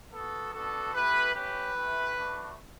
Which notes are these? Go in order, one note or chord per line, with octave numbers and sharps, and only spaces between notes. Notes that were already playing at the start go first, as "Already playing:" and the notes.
B3 F#4 A4
B3 D4 F#4 A4
A3 E4 G4 B4
A3 C#4 G4 B4
A3 E4 G4
A3 D4 F#4